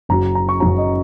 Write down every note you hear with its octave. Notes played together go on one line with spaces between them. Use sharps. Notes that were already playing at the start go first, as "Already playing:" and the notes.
F#1 F#2 F#3 A#5
A#5
C#6
F#1 F#2 F#3 A#5
D#5